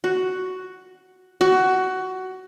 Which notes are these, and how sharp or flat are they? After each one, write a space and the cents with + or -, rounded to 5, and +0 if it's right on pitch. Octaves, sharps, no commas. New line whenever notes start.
F#4 +5
F#4 +15